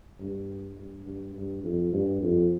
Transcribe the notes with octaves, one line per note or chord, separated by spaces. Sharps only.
G2
G2
G2
G2
F2
G2
F2